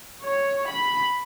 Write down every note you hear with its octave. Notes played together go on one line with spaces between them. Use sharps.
C#5
B5